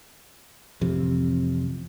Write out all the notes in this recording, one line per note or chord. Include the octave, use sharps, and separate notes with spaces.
A1 F2 C3